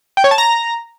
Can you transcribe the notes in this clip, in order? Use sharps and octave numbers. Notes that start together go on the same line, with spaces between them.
G5
C#5
A5
A#5